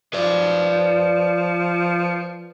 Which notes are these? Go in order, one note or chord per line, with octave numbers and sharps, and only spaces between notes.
F3 B4 D5